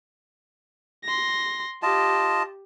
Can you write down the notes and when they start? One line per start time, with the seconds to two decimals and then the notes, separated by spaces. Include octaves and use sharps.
1.04 C6 A#6
1.83 F4 G4 D#5 A5